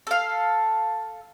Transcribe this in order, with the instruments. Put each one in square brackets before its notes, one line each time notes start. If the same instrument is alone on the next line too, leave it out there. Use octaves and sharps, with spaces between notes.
[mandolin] A4 F5